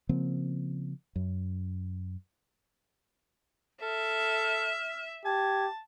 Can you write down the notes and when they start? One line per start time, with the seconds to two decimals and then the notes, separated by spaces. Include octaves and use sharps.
0.09 C#3 F3 A#3 C4
1.16 F#2
3.82 A4 E5 F6
5.25 G4 A5 G#6